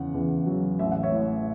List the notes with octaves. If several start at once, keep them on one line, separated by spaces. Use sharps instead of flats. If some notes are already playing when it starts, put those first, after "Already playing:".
Already playing: E2 C#3 F#5
E2
F#3
A1 E5
F#5
C#5 E5
A2